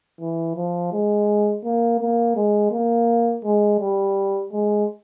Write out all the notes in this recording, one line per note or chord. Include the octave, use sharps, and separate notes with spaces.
E3
F3
G#3
A#3
A#3
G#3
A#3
G#3
G3
G#3